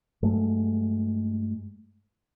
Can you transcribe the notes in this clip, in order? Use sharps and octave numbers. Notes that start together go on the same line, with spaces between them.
G2 F#3 G#3 A3